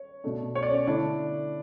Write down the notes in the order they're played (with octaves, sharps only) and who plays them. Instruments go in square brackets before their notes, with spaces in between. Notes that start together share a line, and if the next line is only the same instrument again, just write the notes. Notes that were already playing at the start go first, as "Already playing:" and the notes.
Already playing: [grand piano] C#5
B2 A3 D4
C#5
D5
C#4 C#5
D3 A3 D4 E4 D5